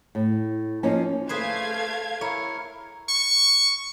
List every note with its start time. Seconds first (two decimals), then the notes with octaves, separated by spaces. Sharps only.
0.15 A2
0.83 F3 A#3 C#4 D#4
1.29 A3 G#4 B4 C5 F5 G#6
2.21 E4 A#4 C#5
3.09 C#6